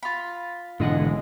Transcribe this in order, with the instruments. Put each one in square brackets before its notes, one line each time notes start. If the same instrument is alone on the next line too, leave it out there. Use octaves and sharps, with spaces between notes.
[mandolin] F4 B5
[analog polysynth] A1 G#3 [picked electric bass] G#2 B2 E3 [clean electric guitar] D3 D#5 F#5